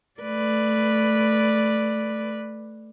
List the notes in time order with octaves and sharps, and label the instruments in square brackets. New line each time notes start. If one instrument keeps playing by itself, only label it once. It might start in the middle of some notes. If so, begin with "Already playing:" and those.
[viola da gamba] A3 B4 D5